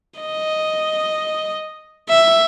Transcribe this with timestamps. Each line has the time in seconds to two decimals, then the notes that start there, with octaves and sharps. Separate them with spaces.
0.20 D#5
2.09 E5